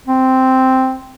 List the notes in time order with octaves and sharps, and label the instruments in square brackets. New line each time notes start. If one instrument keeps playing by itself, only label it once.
[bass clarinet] C4